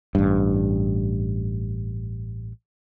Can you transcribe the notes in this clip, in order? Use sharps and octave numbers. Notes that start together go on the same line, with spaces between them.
A1 G2